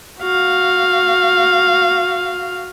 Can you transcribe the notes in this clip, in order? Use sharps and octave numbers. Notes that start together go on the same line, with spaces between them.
F#4 F5